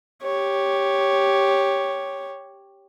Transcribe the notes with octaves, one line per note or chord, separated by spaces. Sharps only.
G4 C#5